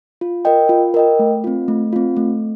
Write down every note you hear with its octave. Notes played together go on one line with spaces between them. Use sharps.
F4
A#4 D#5 G5
F4
A#4 D#5 G5
A3
C4 F4
A3
C4 F4
A3